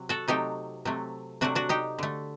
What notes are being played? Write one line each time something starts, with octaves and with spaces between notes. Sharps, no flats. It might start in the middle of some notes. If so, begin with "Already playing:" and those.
Already playing: C3 F#3
F#4 A4
C3 F#3 A3 D#4 G4
C3 F#3 A3
C3 F#3 A3 D4 F#4
D4 F#4
D#4 G4
D3 A3